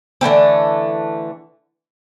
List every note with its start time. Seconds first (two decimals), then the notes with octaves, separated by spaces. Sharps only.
0.21 D3 E3 A3 C4